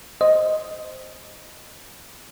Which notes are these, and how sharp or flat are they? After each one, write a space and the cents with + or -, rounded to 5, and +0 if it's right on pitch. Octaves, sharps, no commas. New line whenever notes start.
C5 +0 D#5 +0